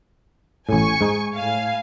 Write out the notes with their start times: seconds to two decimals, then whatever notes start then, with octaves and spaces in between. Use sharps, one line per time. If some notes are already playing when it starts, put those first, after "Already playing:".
0.69 A1 A2 G#5 C#6
1.01 G#2 D#4
1.35 A2 F5 G#5